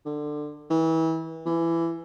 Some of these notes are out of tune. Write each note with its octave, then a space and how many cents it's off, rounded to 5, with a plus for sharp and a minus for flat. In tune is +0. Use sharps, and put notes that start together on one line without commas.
D3 +20
E3 -30
E3 +20